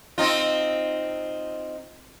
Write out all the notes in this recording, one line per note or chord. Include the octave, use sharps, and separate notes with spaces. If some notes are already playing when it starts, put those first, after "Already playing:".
C4 D#4 F4